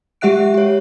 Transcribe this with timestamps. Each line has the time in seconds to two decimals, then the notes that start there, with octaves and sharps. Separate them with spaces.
0.21 G#3 G4 E5 F#5 F#6 D7
0.54 G4 C#5